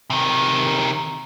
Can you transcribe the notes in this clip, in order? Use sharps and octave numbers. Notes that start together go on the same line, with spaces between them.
C3 D#3